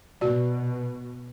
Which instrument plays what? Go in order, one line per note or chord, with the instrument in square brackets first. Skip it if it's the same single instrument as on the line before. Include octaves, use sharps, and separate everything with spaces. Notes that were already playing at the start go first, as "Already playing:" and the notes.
[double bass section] B2 [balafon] F#4 D5